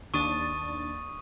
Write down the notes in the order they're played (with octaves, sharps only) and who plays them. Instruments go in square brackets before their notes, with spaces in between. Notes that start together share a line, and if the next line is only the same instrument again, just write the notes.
[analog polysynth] D#2 D4 A6 [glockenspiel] C#6 D#6 D#7